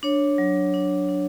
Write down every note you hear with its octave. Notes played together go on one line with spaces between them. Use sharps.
D4 C#5
F#3
D4
D4